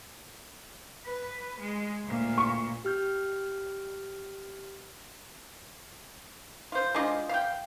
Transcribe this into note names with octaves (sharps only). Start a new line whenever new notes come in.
B4
G#3
D2 A#2
C#6
G4 F6 G6
F4 C5
G#3 D4 F4 D#5
F5 G5